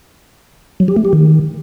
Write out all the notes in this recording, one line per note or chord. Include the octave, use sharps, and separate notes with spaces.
F#3
G4
A3
G4
D#3